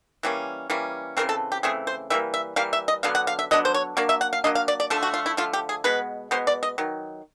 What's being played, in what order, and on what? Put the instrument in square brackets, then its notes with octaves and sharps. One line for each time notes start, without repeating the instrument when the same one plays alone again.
[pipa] E3 G3 A#3 C#4
E3 G3 A#3 C#4
C#3 E3 A3 C4 A#4
A4
G4
C#3 E3 A3 C4 G#4
C5
E3 G3 A#3 E5
E5
E3 G3 A#3 F5
E5
D#5
D3 F#3 B3 D4 F5
F#5
F5
E5
D3 F#3 B3 D4 D#5
C5
C#5
F#3 A#3 D4 D5
E5
F#5
F5
F#3 A#3 D4 D#5
F5
D5
D5
D3 F3 A3 A4
F#4
F4
E4
D3 F3 A3 F4
G4
G#4
B2 G#3 B3 B4
B2 G#3 B3 C5
D5
D#5
D#3 F#3